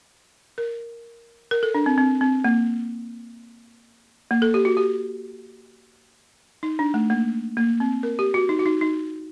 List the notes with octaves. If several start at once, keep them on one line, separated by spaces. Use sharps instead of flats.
A#4
A#4
A4
D4
C4
C4
C4
A#3
A#3
A4
G4
F#4
G4
D#4
D4
A3
A#3
A#3
C4
A#4
G4
F#4
D#4
F#4
D#4
D#4